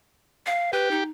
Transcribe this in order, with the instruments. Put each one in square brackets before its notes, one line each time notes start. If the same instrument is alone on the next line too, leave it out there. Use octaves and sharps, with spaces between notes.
[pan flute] F5
[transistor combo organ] G4 [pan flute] B4
[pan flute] D#4